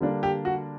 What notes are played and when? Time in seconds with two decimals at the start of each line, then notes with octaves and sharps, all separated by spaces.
0.01 D3 G3 A#3 D4
0.23 G4
0.45 F#4